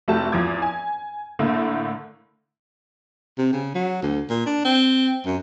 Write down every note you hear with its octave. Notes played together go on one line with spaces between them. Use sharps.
F1 A3 F#4 G4 A5
E2 F3 D6 G#6
G#5
A2 D3 A3 A#3
C3
C#3
F#3
D2
A#2
D4
C4
F#2